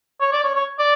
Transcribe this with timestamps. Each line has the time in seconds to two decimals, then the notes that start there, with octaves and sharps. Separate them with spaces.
0.21 C#5
0.33 D5
0.44 C#5
0.55 C#5
0.79 D5